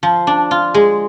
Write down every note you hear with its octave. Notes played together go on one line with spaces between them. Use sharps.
F3
D4
F4
G#3